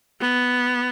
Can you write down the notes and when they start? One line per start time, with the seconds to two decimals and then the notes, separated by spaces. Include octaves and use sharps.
0.20 B3